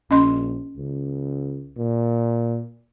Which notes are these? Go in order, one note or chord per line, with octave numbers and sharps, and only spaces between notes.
A#1 C#4 D#5 C6
C#2
A#2